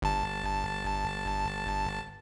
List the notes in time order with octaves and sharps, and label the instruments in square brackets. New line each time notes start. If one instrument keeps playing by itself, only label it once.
[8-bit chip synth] G1 A5